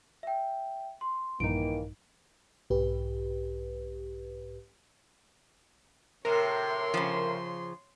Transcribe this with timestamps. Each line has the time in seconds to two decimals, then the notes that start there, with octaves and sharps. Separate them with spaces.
0.23 E5 G5
1.01 C6
1.40 A#1 G2 D#3 E3 A#3 D#4 D7
2.70 B1 G#2 G4 B4
6.25 A2 C3 A#4 C#5 C6
6.94 C#3 F3